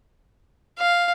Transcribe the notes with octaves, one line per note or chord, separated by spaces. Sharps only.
F5